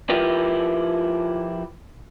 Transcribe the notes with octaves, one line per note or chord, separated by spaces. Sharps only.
F3 E4 F4 G4 A#4 B4